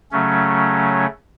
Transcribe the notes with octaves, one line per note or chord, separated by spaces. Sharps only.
C#3 F#3 A3 C#4